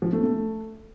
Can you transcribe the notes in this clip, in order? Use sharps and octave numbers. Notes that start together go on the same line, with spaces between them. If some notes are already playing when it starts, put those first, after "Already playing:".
F3
A3
A3